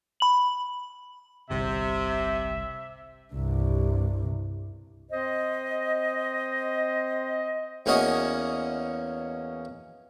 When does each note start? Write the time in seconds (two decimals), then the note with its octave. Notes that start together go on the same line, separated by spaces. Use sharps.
0.20 B5 F#7
1.50 G1 C2 C3 E5
3.33 C2 G2
5.11 C4 C5 D#5
7.86 E2 A#3 C#4 F#4 C#5 D#5